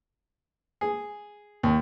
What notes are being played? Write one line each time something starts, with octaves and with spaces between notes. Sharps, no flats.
G#4
D#2